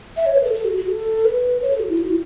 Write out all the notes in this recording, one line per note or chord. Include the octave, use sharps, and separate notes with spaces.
E5
C#5
B4
A4
A4
F#4
F#4
A4
B4
C#5
A4
F#4
E4
F#4
E4